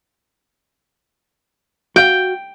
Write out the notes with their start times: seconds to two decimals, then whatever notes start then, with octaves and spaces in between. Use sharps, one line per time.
1.96 F#4 F5 G5